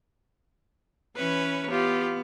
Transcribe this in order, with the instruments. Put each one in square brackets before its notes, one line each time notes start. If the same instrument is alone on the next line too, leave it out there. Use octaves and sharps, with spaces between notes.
[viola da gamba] E3 C#4 C#5 [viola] B4
[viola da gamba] B3 [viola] F4 G4